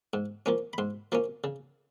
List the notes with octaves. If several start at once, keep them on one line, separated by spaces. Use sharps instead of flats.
G#2
F3 A#3 C#4
B5
G#2 C6
F3 A#3 C#4
C#3